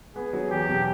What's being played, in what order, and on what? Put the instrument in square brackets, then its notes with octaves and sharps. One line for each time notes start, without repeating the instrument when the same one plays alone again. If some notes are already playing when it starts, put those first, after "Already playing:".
[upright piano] B3 [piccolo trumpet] G#4
[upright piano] F#3
[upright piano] E2 [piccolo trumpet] G4
[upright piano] B2